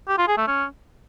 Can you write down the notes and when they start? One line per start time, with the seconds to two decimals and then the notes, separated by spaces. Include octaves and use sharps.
0.08 G4
0.18 F4
0.28 G#4
0.37 A3
0.47 C#4